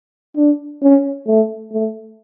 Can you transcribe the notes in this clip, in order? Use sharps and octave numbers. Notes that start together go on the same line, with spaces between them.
D4
C#4
A3
A3